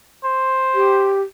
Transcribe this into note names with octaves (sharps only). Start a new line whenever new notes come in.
C5
G4